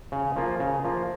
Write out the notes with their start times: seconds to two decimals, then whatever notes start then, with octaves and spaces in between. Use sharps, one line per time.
0.12 C#3
0.36 F3 A#3 F4
0.60 C#3
0.84 F3 A#3 F4